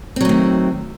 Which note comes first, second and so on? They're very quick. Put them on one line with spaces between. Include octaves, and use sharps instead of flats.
C4 F#3 A3 D#3